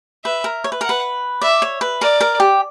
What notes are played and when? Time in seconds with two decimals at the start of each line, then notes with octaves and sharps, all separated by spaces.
0.24 B4 E5
0.44 A#4
0.64 C#5
0.72 B4
0.81 A#4 F#5
0.89 B4
1.42 D5 E5
1.62 C#5
1.81 B4
2.01 A#4 D5
2.21 A#4
2.40 G4